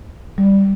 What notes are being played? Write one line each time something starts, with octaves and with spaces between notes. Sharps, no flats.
G3